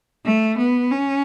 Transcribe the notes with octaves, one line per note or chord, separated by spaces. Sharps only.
A3
B3
C#4